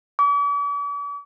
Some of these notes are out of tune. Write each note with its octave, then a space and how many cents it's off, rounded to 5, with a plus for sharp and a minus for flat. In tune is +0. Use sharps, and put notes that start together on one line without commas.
D6 -45